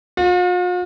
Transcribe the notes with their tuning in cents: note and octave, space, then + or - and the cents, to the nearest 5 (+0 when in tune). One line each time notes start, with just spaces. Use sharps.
F4 +45